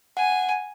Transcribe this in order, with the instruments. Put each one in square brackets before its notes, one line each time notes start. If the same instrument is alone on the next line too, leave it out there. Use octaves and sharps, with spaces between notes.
[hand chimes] F#5 [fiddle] G#5